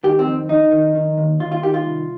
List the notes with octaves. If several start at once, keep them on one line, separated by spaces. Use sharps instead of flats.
D#3 G4
C4
F2
F2 D#4
D#3
D#3
D#2
D#2 F4
F4
D#3 G4
F4
C2